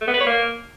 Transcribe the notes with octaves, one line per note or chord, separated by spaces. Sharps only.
A3
B3
B4
C#5
A#3